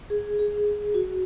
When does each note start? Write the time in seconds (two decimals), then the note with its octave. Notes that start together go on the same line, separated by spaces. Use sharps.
0.10 G#4
0.39 G#4
0.94 F#4